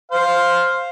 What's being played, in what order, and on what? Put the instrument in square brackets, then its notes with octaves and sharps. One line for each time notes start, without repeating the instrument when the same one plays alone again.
[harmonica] C5 F5